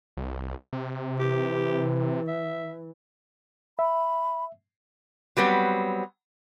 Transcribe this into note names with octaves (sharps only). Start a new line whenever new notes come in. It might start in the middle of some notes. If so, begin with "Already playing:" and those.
C2
C3
E3 G4
E5
E5 B5
F#3 G3 B3 C4